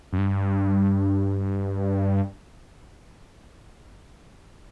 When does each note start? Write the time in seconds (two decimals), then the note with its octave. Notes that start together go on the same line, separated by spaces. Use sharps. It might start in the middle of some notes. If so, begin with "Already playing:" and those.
0.13 F#2
0.18 G2